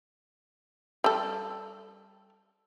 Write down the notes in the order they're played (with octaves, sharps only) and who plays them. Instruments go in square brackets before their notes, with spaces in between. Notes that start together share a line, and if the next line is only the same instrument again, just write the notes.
[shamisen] G3 A4